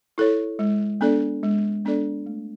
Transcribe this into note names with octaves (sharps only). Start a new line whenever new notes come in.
E4 A4 C#5
G#3
B3 D4 A4 D5
G#3
B3 D4 A4 D5
A3